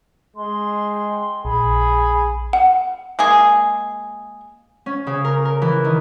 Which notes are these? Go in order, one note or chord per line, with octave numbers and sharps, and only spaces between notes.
G#3 C6
G5
A#1 G#4 B5
F#5
G#3 A#3 G#4
C#4
C#3
A#4
A#4
E3
D#3